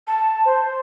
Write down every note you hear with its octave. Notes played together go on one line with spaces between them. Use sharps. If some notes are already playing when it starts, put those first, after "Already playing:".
A5
C5